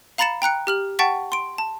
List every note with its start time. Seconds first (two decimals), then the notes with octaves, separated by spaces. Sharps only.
0.18 F5 A#5 B5 A6 C#7 E7
0.42 G5 A#5 F#6 C#7
0.67 G4 F6 F#7
0.99 F#5 G5 A5 C#6 A6 B6
1.32 C6 D7
1.58 A5